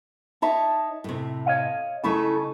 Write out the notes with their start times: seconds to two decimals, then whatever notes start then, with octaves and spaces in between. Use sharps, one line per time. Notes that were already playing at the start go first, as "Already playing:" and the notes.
0.42 D#4 C#5 E5 A5
1.04 A2 C3
1.46 C#5 D#5 F5
2.04 C#3 A3 D#4 E4 A4